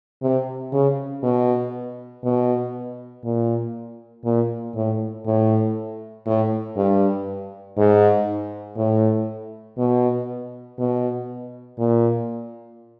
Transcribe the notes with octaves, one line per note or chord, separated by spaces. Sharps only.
C3
C#3
B2
B2
A#2
A#2
A2
A2
A2
G2
G#2
A2
B2
B2
A#2